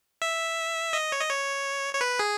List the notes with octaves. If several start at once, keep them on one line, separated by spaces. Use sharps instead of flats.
E5
D#5
C#5
D#5
C#5
C#5
B4
G#4